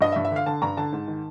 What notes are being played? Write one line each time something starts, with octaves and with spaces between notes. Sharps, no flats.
G2 D#5
E5
G2
E5
D3 F5
D3 A5
G2 A#5
D3 A5
G#2
D#3